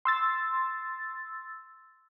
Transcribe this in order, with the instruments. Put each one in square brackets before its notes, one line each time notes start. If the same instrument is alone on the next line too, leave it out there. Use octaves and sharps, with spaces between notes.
[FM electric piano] C6 E6 A6